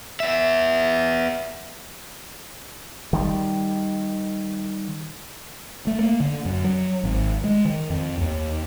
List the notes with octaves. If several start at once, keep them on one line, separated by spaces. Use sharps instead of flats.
B3 E5
D#3 G3
A3
A#3
D3
F#2
F#3
G#1
G#3
D#3
F2
D#2